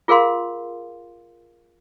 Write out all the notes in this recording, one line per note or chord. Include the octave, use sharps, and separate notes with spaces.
F4 G#4 A#4 F5 C6